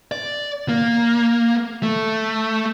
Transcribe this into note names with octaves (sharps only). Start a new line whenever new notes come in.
D5
A#3
A3